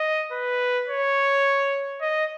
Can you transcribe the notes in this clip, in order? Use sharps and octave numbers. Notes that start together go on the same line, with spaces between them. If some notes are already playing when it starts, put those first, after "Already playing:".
Already playing: D#5
B4
C#5
D#5